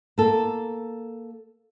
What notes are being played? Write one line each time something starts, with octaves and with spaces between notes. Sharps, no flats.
A#3 A4